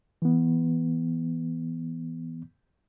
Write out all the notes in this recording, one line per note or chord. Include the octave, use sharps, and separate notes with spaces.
E3 B3